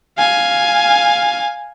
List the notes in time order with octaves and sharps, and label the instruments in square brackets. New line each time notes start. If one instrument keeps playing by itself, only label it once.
[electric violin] F5 G#5